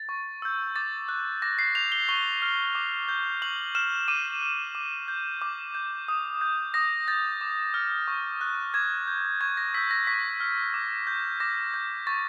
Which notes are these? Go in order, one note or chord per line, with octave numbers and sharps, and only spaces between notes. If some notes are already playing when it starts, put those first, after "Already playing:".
Already playing: A6
C#6
E6 G6
D6 A6
F#6
D6 A#6
C7
G6 F7
G7
C#6 G7
F6
D6
G6
C#6 F#7
F6 E7
D6 D#7
F6
D6
G6
D6
G6
D#6
G6
D#6 A#6
G6 A6
D6
F6
C#6
F#6
D6 G#6
G6
C#6 G#6
A#6
E6 G6 B6
A#6
C#6 B6
F6
D6
G6
D6 A#6
G6
C#6 A6